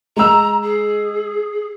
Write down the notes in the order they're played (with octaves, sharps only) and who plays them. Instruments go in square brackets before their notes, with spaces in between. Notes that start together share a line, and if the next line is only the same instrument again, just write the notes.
[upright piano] G#3 E6 [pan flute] A#5
[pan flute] G#4